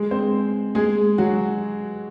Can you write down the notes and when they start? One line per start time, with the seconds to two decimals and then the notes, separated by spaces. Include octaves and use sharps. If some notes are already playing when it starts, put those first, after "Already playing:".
Already playing: G#3 G#4
0.11 C4 C5
0.75 G#3 G#4
1.18 F#3 F#4